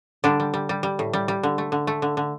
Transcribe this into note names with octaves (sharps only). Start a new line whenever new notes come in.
D3 G3 D4
G3
G3
G3
G3
A2
G3
G3
D3
A3
D3
A3
D3
D3